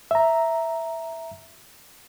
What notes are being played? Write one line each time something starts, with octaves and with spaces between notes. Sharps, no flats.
E5 A#5